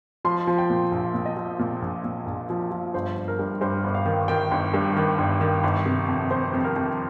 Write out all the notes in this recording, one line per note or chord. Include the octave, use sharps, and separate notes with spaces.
F3 C6
F3
G5
A#2
A#1
A#2
D#5
F3
A#2
A#1
A#2
A#1
F3
F3
G1 C5
G1
A#4
G2
G2 C5
G1
F5
D#3
D#3 G5
G1
G2
D#3
G1
D#3
G1
C3
F2
F2 C5
F2
A#4
F2